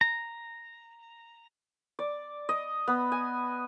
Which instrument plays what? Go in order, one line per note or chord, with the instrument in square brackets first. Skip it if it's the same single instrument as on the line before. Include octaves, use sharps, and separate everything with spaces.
[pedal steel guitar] A#5
[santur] D5
D#5
B3
G#5